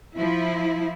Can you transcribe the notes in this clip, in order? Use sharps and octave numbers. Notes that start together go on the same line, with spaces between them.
F3 E4